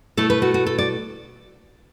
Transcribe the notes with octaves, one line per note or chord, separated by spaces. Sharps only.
B2 A3 E4 A4
B4
F#4
F#4
A4
D5